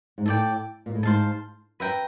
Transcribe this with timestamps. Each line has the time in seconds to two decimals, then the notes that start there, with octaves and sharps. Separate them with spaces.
0.18 G#2
0.26 A2 A4 D5 G5
0.86 A#2
0.95 A2
1.03 G#2 C5 F5 A5
1.80 F#2 B4 E5 G5 A#5